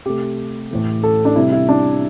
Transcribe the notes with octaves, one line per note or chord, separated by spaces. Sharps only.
C3 A3 G4
A2 E3 A3
A4
D4
C3 G3 E4
E4
D4